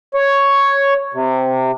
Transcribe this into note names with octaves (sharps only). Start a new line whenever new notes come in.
C#5
C3